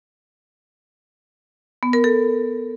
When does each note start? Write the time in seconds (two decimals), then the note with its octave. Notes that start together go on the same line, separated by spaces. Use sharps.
1.83 B3
1.93 A#4
2.04 A4